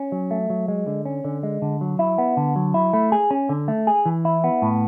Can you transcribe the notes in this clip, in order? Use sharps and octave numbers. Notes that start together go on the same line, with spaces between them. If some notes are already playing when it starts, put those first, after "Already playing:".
Already playing: C#4
F#3
A3
F#3
G#3
D3
C#4
D3
G#3
D3
F#3
E4
B3
D3
F#3
E4
A3
G#4
C#4
D3
A3
G#4
E3
E4
B3
A2